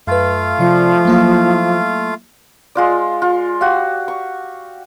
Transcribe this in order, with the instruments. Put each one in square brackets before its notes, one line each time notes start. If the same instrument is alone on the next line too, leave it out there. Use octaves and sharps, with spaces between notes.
[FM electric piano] F#2 B4 [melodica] A3 F4 F5
[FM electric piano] C3 D5 C7 [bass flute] F3
[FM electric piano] F#3 A#3 E4
[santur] G#3 F4 D5
F4
F#4 G4 F5
C#6